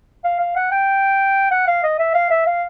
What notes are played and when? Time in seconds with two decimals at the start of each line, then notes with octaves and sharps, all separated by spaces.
0.24 F5
0.39 F5
0.56 F#5
0.72 G5
1.51 F#5
1.67 F5
1.83 D#5
1.99 E5
2.14 F5
2.31 E5
2.47 F5